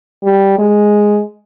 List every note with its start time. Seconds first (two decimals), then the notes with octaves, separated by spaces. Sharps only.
0.23 G3
0.59 G#3